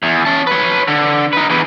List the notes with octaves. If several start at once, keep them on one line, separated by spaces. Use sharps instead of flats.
E2
C#4 A5
B4 C#5
D3
D#4 B4
E2 E3